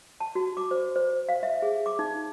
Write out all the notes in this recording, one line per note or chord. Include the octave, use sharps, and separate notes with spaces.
A5
F#4
D6
C5
C5
F5
E5
G#4
D6
D#4